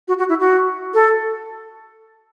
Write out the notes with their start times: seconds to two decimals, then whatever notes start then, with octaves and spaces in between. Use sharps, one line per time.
0.08 F#4
0.18 F#4
0.29 E4
0.40 F#4
0.94 A4